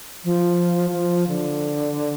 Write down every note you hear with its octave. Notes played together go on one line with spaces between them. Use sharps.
F3
F3
D3